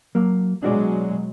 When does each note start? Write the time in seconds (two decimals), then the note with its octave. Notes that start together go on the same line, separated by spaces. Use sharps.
0.15 F#3 A#3
0.63 B2 F#3 G#3 D4 F#4 D5